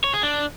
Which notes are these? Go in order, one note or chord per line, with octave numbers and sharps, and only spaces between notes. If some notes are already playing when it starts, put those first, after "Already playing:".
C#5
G#4
D4